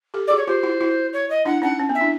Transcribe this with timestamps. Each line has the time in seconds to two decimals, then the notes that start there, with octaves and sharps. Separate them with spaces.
0.14 G4 A4
0.27 F#4 G#4 D5
0.37 C#5
0.47 F4 G4 C5
0.63 E4 F#4
0.81 E4 F#4
1.13 C#5
1.30 D#5
1.45 D4 E4 F#5
1.62 C#4 D#4 F#5
1.79 C#4
1.89 B3
1.95 E5
2.01 D4 E4